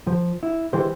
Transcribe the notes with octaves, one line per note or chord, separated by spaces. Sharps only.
F3
E4
E3 G#3 G4 C5